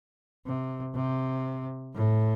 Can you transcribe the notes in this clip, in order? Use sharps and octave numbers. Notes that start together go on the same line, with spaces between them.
C3
C3
A2